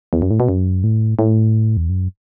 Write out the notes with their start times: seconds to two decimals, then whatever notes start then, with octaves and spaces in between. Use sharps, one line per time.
0.13 E2
0.22 F#2
0.31 A2
0.40 B2
0.49 F#2
0.84 A2
1.19 A2
1.77 E2
1.90 F#2